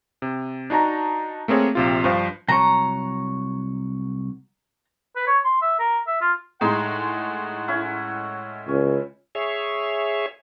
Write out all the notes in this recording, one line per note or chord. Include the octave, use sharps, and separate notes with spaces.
C3
D4 D#4 F#4 A5 A#5
A3 A#3 C4 G#4 C#5
A#1 C3 F4
G2 F3 C5 F5
C2 F#3 C#5 A#5
B4
C#5
C6
E5
A#4
E5
F4
A2 G#3 D#4 F#5 C6
C#4 E4
C#2 C#4
G#4 C#5 E5